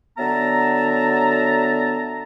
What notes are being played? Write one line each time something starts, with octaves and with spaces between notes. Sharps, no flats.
D3 F#3 B3 E5 A5 A#5